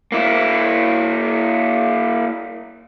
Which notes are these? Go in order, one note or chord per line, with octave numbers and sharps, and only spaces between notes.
A#3 E4